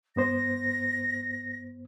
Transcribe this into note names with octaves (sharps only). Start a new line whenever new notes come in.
G2 B3 C5 A#6